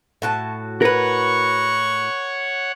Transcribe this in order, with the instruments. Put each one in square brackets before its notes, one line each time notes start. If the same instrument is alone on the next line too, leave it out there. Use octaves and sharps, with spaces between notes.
[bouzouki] A2 F#4 A5
[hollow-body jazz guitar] A#4 B4 [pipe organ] C#5 F#5 [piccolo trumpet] C#6